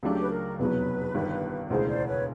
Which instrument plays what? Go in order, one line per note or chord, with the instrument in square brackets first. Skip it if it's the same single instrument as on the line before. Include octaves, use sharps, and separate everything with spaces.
[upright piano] C#2 C#3 F#3 A3 D4 [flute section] G4
[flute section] B4
A#4
[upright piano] F1 E2 B2 F#3 [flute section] B4
[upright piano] G1 G2 D#3
[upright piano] E1 D2 C#3 E3 G#3 [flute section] C5
[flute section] C5 D5
B4 C#5